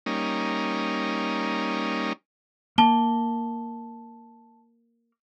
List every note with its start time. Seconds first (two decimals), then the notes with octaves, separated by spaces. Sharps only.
0.06 G3 A#3 C#4 D#4
2.78 A#3 A5 G7